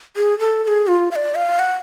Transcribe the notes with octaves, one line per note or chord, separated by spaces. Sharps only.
G#4
A4
A4
G#4
F4
F5
D5
F5
F#5